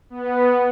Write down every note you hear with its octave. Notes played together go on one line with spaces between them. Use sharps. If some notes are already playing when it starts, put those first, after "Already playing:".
B3